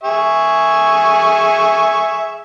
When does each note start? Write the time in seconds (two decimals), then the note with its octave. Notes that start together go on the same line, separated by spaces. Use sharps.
0.03 G#4 E5 C#6